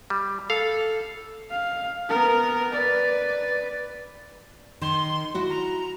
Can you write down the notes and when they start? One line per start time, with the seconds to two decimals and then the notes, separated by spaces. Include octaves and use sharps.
0.10 G3
0.50 A4 F5
1.50 F5
2.10 B3 A#4
2.74 B4 D5
4.81 D#3 C6
5.35 E4 F#4
5.49 A#5